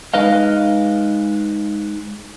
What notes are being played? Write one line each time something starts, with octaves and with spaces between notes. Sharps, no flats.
G#3 D#4 B4 D#5 F5